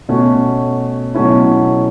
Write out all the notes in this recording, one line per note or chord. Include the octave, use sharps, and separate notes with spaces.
B2 A3 C#4
B2 F#3 A3 C#4 E4